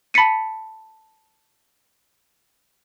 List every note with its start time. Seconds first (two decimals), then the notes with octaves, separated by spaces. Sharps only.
0.14 A5 B5 A6 B6 C#7 D#7